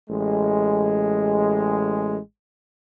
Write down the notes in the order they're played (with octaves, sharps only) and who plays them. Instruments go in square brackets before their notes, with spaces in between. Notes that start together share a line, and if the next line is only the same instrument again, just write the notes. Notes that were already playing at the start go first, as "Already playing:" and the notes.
[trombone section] A1 G#3